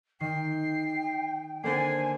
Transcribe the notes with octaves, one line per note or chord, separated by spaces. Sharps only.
D#3 G5 C7
D3 A#3 C4 C5 G#5 C7